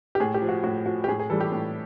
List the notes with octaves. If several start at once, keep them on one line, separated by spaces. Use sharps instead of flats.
G4
A2 G#4
G4
F3
F#4
A2 F#4
F3 F#4
G4
A2 G#4
G#4
E3 G3 A4
G4
A2